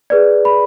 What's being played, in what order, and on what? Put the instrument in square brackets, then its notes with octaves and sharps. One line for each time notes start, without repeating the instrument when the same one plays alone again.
[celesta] G#4 B4 D5
B5